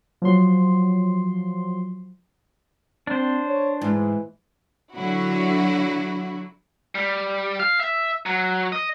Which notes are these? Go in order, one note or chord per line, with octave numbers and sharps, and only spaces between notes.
F3 F#3 C6
C4 D4 C5
C#5
G#2 E3
D3 F#3 E4 F#4
G3
F5
E5
F#3
D#5